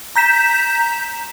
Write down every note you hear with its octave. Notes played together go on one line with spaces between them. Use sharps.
A#5 G6 B6 E7